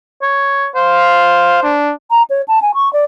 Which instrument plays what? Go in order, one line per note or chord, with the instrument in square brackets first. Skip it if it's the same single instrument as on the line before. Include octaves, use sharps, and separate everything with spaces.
[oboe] C#5
[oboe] C5 [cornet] F5
[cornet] D4
[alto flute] A#5
C#5
A5
G#5
C#6
D5